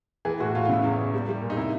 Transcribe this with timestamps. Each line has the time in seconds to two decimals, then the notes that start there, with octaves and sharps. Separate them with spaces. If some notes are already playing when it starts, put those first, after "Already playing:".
0.25 E3 G#4
0.40 A2 F#4
0.55 A2 F4
0.65 F4
0.69 C#3 E4
0.84 E2
0.99 E2
1.14 G3
1.29 G3
1.42 A#2
1.50 D#4
1.57 C3 E4